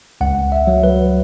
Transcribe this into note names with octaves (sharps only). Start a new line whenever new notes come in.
C#2 F#5
E5
F#3
B4